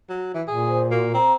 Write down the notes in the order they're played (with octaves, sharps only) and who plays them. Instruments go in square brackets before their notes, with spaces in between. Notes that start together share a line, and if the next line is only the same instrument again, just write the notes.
[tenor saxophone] F#3
E3
[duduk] A#2 [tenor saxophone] G#4
[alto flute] C5
[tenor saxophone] A#3 [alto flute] F#4
[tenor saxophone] C4 [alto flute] A#5